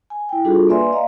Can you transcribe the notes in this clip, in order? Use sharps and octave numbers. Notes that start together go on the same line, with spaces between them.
G#5
E4 G5
G3 D4 F4 F#4 G#4 A4
A#3 B4 D5 E5 G#5 C6
D5 D#5 F5 A#5